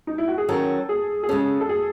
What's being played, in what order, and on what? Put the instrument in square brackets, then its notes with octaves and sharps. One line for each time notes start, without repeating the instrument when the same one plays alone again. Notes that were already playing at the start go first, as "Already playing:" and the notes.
[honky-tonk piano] D#4
E4
F#4
G#4
[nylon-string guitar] D#3 F#3 C#4 [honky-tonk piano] A4
[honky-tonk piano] G#4
G#4
[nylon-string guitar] C#3 G#3 C#4 [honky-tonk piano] A4
[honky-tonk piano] A4
G#4